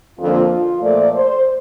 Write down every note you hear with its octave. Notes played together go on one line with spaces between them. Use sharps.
F2 D3 F3 A#3 F4
A#2 F3 A3 D5
C5